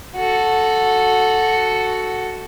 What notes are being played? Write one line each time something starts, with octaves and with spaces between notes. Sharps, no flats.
F#4 A4